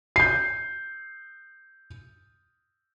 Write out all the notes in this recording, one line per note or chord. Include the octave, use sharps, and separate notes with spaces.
G6 C7